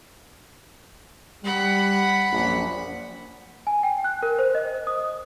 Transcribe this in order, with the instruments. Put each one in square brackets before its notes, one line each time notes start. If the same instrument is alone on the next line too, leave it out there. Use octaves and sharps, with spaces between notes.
[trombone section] G3 [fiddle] F#5 B5
[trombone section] A#1 F#2
[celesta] G#5
G5
F#6
A#4
C5
D#5
D#6